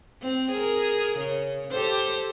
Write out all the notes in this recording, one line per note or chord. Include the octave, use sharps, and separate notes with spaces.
C4
G#4 A#4
C#3
G4 A4 C5